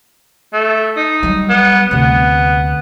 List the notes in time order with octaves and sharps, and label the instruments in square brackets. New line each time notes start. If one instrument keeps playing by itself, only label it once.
[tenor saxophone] A3
D#4
[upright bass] F#3 G3
[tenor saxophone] B3
[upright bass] D2 C3 [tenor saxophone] B3